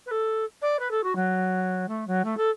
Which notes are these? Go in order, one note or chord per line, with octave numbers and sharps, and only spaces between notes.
B4
A4
D5
B4
A4
F#4
F#3
A3
F#3
A3
A4